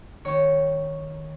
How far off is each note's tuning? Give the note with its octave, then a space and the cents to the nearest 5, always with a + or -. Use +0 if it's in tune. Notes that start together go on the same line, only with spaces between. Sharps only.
D#3 +0 C#5 +0